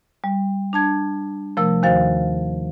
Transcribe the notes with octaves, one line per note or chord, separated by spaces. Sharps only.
G3
D4 A5 G#6
C3 F3 A3 A#4 E6
D#2 D#3 F#4 C5 F5 A6